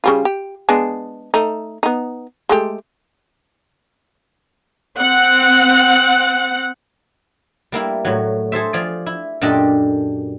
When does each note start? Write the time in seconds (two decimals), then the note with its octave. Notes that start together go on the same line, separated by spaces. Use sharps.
0.04 C#3 G3 F4
0.25 G4
0.69 G#3 B3 D4
1.34 A3 D#4
1.83 B3 D#4
2.49 G#3 A3 G4
4.98 C4 F#5
7.72 G3 A#3 E4
8.05 A2 F#3
8.52 G#4 A4 C5 E5
8.73 F3 G#4 D5
9.06 E4
9.41 F#2 A#2 D4 G4 A4 D#5